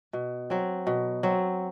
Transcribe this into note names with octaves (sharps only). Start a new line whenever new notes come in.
B2
F#3 C4
B2
F#3 C4